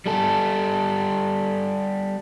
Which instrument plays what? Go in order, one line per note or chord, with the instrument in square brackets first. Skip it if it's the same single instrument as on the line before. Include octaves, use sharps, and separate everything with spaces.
[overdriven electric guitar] G3 A4